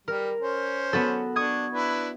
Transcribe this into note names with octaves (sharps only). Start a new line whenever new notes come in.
G3 A#4
C#4 C5
B3 F#4 A4
D4 C#6 D#6 G#6
D4 E4 B4